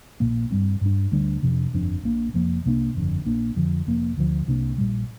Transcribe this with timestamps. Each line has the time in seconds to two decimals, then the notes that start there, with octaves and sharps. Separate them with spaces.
0.20 A#1 A#2 A#3
0.51 G2 G3 C4
0.81 G2 G3 D4
1.12 D2 D3 G3 D4
1.42 F2 C3 F3 D4
1.73 G1 F2 F3 D4
2.03 A#1 A#2 A#3 D4
2.34 F1 F2 F3 A#3
2.65 C2 C3 A#3 D4
2.95 G1 F2 D3
3.25 A#1 A#2 A#3 D4
3.56 F2 D3 F3
3.87 F1 F2 F3 A#3
4.17 D2 D3 F3
4.47 C2 C3 A#3 D4
4.78 A#1 A#2 G3